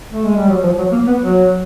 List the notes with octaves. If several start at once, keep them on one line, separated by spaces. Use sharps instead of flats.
A3
G#3
G3
F#3
F3
F#3
A#3
B3
F#3